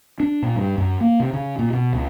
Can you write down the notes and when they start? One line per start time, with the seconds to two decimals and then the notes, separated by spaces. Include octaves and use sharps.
0.20 D4
0.42 A#2
0.55 G2
0.78 F#2
1.01 A#3
1.20 C3
1.34 C#3
1.59 A#2
1.73 B2
1.93 C#2